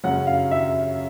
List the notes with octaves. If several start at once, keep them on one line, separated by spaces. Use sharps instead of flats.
F#2 C#3 F#3 F#5
F5
E5